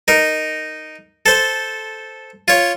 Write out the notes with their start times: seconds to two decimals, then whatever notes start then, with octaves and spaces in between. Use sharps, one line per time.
0.08 D#4 A#4
1.26 A4 C5
2.48 F4 C#5